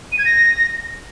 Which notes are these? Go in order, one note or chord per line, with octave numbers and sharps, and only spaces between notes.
D#7
G#6
A#6